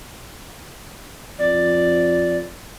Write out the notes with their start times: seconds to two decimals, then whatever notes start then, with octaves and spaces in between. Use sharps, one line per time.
1.39 F2 D5